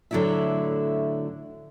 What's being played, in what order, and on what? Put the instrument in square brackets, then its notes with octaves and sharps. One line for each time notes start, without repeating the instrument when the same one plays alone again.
[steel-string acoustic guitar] A2 D3 F#3 E4 F#4 E5